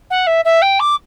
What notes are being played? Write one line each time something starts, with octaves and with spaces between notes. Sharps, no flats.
F#5
E5
E5
G5
D6